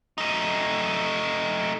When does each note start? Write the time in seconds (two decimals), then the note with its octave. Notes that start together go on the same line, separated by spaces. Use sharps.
0.18 A3 D#4